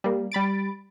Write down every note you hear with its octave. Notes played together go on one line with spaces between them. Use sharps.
G3 A#3
G3 B5 A6 D7